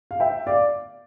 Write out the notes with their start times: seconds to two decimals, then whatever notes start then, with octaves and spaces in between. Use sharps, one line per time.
0.11 F5
0.20 E5 G5
0.47 D5 F5